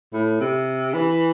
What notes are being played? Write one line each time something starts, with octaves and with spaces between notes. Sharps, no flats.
A2
C3
E3